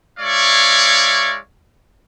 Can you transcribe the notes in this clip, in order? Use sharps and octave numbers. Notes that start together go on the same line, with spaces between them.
G#3 E4 C#5 D5 F5 C#6